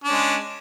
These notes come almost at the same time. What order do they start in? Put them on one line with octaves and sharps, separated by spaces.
D4 C#4 G#3